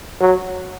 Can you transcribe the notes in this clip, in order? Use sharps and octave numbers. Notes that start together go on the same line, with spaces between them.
F#3